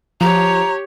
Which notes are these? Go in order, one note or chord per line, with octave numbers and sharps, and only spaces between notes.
F3 G4 C#5 A#5